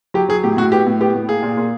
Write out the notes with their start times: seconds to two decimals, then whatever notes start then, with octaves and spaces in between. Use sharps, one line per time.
0.14 F#3 G4
0.29 F#3 G#4
0.44 A2 G4
0.57 A2 F#4
0.72 B3 G4
0.87 A2
1.01 B3 G4
1.15 A2
1.28 A#3 G#4
1.43 A#2
1.57 A#2